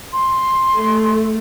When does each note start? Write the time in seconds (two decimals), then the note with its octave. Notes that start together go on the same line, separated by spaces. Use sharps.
0.13 C6
0.76 A3